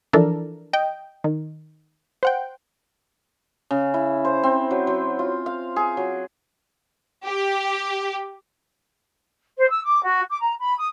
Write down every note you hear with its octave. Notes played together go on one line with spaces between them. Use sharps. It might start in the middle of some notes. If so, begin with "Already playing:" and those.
E3 F3 D4 A4 A#4
D#5 G5
D#3
C5 F#5 G5
C#3
E4
C5
C4
F#3
F#3
F4
F5
G#4
F#3
G4
C5
E6
D6
F#4
D6
A#5
B5
D#6